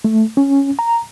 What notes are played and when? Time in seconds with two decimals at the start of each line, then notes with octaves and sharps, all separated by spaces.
0.05 A3
0.37 C#4
0.79 A#5